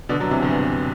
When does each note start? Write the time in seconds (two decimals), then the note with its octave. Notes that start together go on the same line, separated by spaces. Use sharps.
0.09 B2 D3
0.20 D3 F#3
0.31 C3 E3
0.43 E2 G2